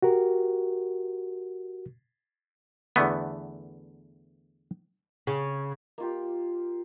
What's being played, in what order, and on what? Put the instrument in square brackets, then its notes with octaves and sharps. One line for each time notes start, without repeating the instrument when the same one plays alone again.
[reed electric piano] F#4 G4 A#4
[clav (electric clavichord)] E2 D3 A3 B3
[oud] C#3
[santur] A#3 F4 G4